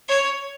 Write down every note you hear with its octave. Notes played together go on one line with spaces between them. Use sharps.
C#5